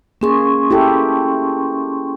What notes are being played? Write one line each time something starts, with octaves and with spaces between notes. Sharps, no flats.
A#3 C#4 G#4 C6 C#6
E4 G4 A4